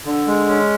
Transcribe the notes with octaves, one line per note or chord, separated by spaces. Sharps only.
D3
G#3
C#4